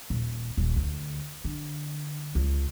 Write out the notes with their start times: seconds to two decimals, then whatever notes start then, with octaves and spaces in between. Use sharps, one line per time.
0.10 D#1
0.57 D#1
0.76 D2
1.45 D3
2.35 C#2